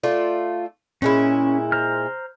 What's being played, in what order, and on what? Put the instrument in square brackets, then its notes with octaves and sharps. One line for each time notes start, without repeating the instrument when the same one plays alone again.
[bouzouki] A3 F4 D5
[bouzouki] A#2 G#3 E4 [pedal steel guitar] C#4
[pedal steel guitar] C5 A#5 F6